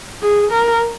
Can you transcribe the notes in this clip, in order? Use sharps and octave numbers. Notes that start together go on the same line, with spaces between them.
G#4
A#4